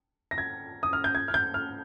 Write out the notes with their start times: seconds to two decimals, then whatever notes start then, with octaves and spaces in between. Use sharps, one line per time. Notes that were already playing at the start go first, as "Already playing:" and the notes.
0.31 A#6
0.38 G#6
0.83 D#6
0.93 F6
1.04 G6
1.15 G#6
1.28 F6
1.34 G6
1.54 F6